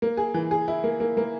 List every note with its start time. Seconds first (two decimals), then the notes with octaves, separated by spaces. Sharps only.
0.02 A#3
0.17 G#4
0.34 E3
0.51 G#4
0.68 E4
0.84 A#3
1.00 A#3
1.17 A#3